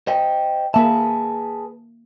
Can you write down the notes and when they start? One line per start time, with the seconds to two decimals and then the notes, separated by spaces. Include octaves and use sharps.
0.07 C5 D#5 G5
0.74 A#3 G#4 B4 E5 A5